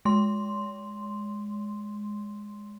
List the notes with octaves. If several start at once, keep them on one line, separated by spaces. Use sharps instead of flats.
G#3 C6